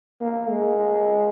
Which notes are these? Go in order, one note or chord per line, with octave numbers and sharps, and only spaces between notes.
A#3
G#3